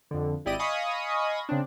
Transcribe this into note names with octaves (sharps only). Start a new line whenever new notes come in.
F2 D3
G#1 E4 G4 D5 D#5 D#7
D#5 F5 G#5 B5 C#6 D#6
C#3 C4 D4